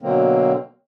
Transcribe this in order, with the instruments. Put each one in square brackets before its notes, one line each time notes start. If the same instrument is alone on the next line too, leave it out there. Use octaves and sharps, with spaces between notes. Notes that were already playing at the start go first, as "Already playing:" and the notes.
[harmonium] B2 D3 F#3 A#3 C4